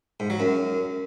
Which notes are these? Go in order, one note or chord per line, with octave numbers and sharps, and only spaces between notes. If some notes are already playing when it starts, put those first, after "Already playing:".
G#2
F#3
F#2